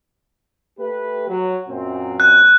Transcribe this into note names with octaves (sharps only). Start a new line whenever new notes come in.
A3 G4 B4
F#3
F#2 A#2 C4
F#6